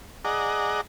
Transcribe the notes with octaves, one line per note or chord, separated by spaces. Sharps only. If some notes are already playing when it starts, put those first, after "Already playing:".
G#4 D5 D#5 F#5 A#5